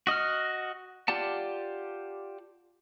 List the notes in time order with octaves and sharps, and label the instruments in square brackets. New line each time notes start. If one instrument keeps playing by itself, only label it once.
[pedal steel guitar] F#4 D#5 F#5 F6
F4 G4 D5 F#5 A5